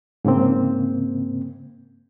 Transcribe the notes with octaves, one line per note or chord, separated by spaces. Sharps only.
G#2 C#3 A#3 C4